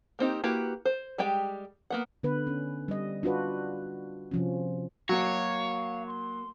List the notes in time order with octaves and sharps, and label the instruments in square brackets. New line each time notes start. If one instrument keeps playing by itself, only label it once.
[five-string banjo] A#3 C4 D#4 G4
A#3 E4 F#4 G4 B4
C5
G3 G#3 G4 G5
A#3 B3 F#5
[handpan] D3 B3 B4
C#4
G3 D#5
D4 F4 F#4 B4
C3 F3 C#4
[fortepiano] F#3 [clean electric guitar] A#3 F#4 [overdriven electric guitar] C#5 [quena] F5
[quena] C6